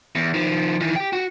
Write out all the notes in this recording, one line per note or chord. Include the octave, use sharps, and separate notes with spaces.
E2
D#3 F3
D#3 E3
G4 G5
F#4